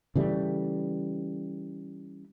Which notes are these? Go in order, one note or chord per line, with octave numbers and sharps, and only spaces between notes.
C#3 E3 G3 A3